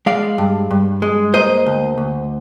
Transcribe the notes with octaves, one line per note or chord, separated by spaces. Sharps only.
G#3 D5 F5
G2
G2
G#3
A#3 C5 D#5
D2
D2